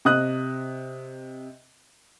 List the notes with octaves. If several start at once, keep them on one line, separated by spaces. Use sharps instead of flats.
C3 D#5 D#6 F#6